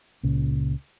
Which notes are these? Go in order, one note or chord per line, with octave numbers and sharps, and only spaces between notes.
C#2 A#2 C#3